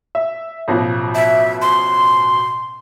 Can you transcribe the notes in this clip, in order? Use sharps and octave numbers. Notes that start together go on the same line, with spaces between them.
E5
A1 B2 F3
E5
C6